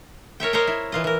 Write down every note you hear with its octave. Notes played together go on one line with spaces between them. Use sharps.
A#4 C#5 E5 G5
A#4 C5 C#5 D#5 A#5
E4
E3 F4 D#5
E3 A#4